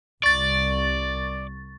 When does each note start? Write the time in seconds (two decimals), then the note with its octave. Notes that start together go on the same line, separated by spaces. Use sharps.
0.23 C2 D5 C#6 A6